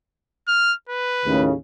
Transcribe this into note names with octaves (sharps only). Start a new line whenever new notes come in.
F6
B4
D#2 A2 C#3